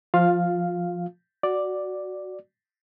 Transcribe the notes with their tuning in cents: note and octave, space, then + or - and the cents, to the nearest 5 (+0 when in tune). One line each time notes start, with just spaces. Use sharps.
F3 +0 F4 +20 F5 +0
F#4 +0 D5 +0